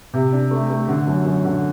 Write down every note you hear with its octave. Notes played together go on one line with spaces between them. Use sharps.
C3
D4
A3
A3
D3
F#2
F#2
D3